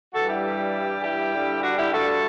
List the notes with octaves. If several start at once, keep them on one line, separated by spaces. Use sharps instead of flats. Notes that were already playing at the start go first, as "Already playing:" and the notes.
G2 E3 G3 F#4 A4
E4 G4
E4 G4
G2 D3 G3
D4 F#4
E4 G4
F#4 A4